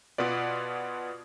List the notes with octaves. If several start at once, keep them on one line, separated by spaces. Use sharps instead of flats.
B2 B3 F4 B4 D5